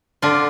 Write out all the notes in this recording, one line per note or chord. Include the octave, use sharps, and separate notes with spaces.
D3 F4